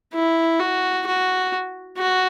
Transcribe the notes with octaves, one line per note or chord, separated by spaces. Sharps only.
E4
F#4
F#4
F#4